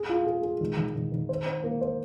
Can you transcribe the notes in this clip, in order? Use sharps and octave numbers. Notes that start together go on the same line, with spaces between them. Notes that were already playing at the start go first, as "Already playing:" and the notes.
Already playing: G#4
F4
G#4
G#4
D#3
D#3
D#3
D#3
C5
C5
A#3
C5